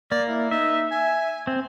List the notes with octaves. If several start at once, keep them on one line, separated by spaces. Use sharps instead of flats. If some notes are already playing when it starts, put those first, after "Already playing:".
A#3 D5
E4
D#4 E5
G#5
C4